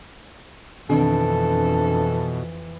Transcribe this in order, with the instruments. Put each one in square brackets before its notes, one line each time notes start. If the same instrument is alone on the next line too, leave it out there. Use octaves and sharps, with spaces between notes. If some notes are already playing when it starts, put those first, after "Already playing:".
[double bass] F2 E3 [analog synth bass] B2 [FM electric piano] D#3 C4 D4 [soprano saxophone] A4